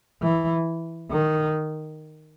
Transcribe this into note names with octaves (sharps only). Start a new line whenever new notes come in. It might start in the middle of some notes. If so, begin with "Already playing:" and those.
E3
D#3